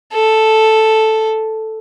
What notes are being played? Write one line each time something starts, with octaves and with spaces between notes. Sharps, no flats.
A4